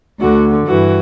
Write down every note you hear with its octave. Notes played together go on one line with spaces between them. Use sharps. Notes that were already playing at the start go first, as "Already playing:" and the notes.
D2 D3 F#4
G2 E3 F#4